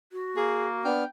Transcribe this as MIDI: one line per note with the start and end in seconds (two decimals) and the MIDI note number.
0.12 0.86 66
0.37 0.91 58
0.37 0.67 68
0.85 1.04 59
0.85 1.04 62
0.85 1.08 79
0.85 1.04 89